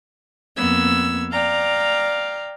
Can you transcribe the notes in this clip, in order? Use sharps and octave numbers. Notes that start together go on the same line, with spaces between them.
F2 A#3 B3 E6 G#6
D5 F5 G5 A#5